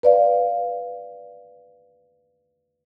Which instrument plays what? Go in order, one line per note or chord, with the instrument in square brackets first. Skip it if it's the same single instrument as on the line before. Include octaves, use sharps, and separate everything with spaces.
[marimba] B4 D5 F5